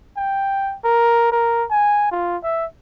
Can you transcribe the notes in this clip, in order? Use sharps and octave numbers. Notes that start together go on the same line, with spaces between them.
G5
A#4
A#4
G#5
F4
E5